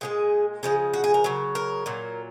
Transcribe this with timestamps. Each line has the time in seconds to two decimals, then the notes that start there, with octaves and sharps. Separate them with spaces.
0.01 A#2 F3 G#3 G#4
0.63 C#3 F3 G#3 G#4
0.94 F#4
1.04 G#4
1.14 A#4
1.24 C#3 F#3
1.55 A#4
1.86 A#2 F#3